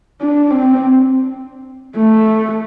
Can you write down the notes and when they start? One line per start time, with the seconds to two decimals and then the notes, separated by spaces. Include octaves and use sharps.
0.21 D4
0.50 C4
1.96 A3